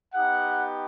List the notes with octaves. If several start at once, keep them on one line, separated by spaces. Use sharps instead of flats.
B3 D#4 G4 F#5